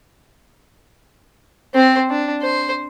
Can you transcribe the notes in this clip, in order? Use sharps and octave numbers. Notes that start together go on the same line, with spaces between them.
C4 C5
D4
C5